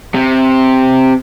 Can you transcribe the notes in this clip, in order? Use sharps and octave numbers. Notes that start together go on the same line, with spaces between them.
C3